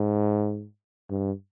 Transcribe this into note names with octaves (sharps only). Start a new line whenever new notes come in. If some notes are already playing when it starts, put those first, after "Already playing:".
Already playing: G#2
G2